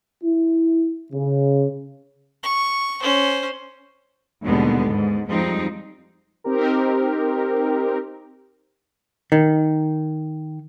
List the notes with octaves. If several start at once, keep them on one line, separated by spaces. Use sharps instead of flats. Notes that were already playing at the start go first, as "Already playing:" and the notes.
E4
C#3
C#6
C#4 C5
D#2 B2 D3 G3 G#3 B3
G#2
F2 F3 G3 G#3 C4 D#4
C4 D#4 G4 A#4
D#3